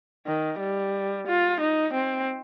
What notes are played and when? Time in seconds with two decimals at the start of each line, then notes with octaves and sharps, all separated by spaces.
0.27 D#3
0.60 G3
1.27 F4
1.60 D#4
1.93 C4